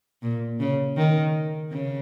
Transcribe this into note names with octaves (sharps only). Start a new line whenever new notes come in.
A#2
C#3
D#3
C#3